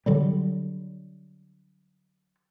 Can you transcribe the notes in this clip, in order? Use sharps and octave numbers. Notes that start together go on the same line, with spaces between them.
D3 F#3 G3